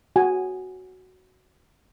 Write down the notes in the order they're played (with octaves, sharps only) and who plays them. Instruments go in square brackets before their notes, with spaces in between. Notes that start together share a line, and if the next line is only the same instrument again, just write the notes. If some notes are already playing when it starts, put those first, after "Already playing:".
[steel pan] F#4 G#5